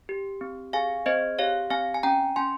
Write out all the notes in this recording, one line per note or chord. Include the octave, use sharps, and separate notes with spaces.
G4
C4
G#4 F5 G#5
C4 C5 D#5
G4 C#5 F5
C4 F5 G#5
G#5
C#4 G5 A#5
C#4 G#5 C6